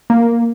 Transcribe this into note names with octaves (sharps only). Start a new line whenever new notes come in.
A#3